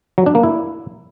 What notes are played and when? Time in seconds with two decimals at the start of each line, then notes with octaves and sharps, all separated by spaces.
0.18 F#3
0.26 D4
0.35 A#3
0.43 E4